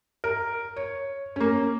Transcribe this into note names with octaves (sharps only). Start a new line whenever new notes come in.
A#4
C#5
A#3 C#4